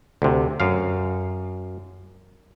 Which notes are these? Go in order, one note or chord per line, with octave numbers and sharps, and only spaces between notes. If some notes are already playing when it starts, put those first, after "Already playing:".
D2 C3
F#2 F5